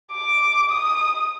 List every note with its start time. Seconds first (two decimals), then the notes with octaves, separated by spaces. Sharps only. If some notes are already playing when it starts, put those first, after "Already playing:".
0.13 D6
0.72 D#6